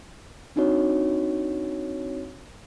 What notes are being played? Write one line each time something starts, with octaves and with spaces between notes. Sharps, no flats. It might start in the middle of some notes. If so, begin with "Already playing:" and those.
C4 D4 D#4 F#4 C#5